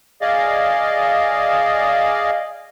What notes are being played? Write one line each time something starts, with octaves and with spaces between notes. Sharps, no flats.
G#4 D5 D#5 F5